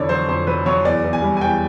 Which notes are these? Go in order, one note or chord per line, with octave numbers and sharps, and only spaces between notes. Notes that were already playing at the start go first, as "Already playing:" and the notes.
Already playing: F2 D3 E3 C#5 D5
F#3 C5
F2 C5
F#3 B4
F#3 C#5
E2 D5
E2
G#5
G3
G#5
E2 G5